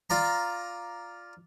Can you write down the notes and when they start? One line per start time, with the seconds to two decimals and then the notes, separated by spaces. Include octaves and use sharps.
0.10 F4 D5 A#5